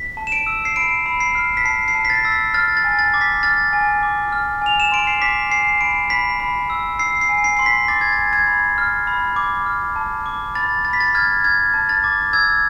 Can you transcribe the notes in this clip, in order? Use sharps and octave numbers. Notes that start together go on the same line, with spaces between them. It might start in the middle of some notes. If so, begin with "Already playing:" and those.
Already playing: B6
A5
E7
D7
E6
C7
B5 D7
B5
C7
F6
B6
A5 C7
C7
A5
B6
A6
E6
B6
F6 A6
A6
G#5
A6
D6
B6
F6 A6
G#5
D6
F6
G#5 F7
E7
C6 D7
C7
D6 B6
G#5 C7
B5 D7
B5 B6
B5
E6
E6 C7
C7
G#5
C7
C6 C7
B6
D6 A6
G#6
A6
G#5
G#6
B5
F6
B5
D6
F6
A5
D6
B5 A6
B5 A6
B6
A6
F6 G#6
F6 G#6
A5
A6
D6
E6 G#6